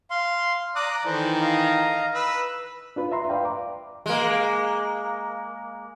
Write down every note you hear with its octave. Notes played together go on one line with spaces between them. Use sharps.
F5 C6
D5 A#5 D6 D#6 F#6
D#3 E3 A4 C5
D#5 F5 A#5
B4 E6
D4 F4 B4
E5 A#5 C6
B4 D5 F5 G5 A#5
D6
G#3 A#3